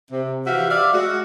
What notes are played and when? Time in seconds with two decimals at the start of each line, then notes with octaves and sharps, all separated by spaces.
0.11 C3
0.47 E3 F3 F#4 G4 E5 F5
0.70 D5 E5 F5
0.93 G#3 F#4